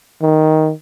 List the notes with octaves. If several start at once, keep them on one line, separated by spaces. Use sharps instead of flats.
D#3